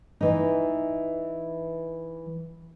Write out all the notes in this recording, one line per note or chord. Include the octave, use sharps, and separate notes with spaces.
E3 D#4